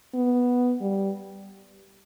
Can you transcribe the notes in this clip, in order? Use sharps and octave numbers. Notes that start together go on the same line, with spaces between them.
B3
G3